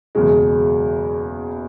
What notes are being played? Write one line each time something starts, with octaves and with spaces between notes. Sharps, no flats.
F#1 E2 B2 G#3